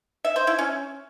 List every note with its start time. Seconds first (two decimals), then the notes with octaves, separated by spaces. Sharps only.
0.25 E5
0.36 C5
0.47 E4
0.59 C#4